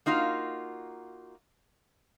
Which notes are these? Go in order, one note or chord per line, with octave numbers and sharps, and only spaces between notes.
A#3 D#4 F4 F#4